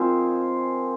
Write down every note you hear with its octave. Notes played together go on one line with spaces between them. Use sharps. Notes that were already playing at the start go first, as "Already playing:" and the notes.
Already playing: F3 C4 D#4 G#4 A#4 C5